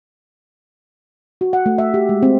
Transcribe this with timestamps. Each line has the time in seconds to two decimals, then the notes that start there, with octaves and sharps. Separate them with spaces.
1.41 F#4
1.53 F#5
1.66 A3
1.78 E5
1.94 G4
2.09 G#3
2.23 C4